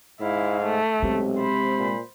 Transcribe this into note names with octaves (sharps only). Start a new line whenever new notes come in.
G#2 E4 F5
A3
B1 C3 G#3
C5 B5
A#2